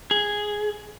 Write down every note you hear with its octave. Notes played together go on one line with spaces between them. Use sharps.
G#4